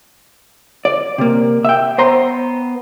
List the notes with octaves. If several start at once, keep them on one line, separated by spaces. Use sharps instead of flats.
D5
C3 A#3
E5 G5
B3 C5 A#5 C6